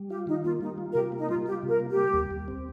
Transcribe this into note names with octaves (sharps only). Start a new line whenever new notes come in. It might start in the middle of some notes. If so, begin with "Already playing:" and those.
Already playing: G3
F4 G4
D#3 D#4
A#3 F4
G3 D#4
F4
A#4
C3 G4
A#3
D#4
G3 F4
F4 G4
C3
A#4
A#3
G4
G3
D#2
D#2
C4